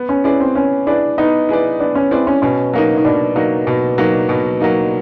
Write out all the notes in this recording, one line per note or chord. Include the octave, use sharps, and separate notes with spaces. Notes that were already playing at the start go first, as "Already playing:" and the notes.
Already playing: B3
C#4
C#4 E4 G#4 B4 D5
C4
B3 C#4
D4 E4 G#4 B4 D5
B3 D#4
E4 G#4 B4 D5
B3 D4
C#4
C4 E4 G#4 B4 D5
C#4
B2 C#4
F#3 A#3 D#4
D#4
B2 D4
F#3 A#3 D#4
B2
F#3 A#3 D#4
B2
F#3 A#3 D#4